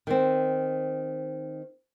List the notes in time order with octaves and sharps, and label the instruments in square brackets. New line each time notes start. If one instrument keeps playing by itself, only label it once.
[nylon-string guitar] D#3 C4